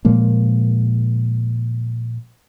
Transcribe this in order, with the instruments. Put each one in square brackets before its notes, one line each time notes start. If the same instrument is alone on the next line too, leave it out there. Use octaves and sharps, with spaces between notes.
[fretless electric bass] A#2 F3 G#3 A#3